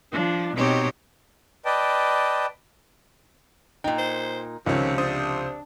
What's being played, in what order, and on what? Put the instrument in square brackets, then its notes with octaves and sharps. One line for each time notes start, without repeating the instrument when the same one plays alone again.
[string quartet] F3 D4
B2 C4 D#4 G4 C#5
[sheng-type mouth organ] B4 D5 D#5 G5 A5
[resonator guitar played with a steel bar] A#2 D#4 [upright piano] G5
[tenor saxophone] C5
[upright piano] C#2 F3 [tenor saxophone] C3 [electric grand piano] D#3 C#4
[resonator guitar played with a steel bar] D4 [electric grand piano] C5 D#6